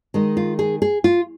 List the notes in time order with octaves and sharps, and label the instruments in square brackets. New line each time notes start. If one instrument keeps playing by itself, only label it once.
[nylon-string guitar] D#3 G#3 D#4
F4
G#4
G#4
F4